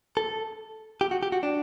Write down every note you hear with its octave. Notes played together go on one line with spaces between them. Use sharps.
A4
G4
F#4
G4
F#4
D4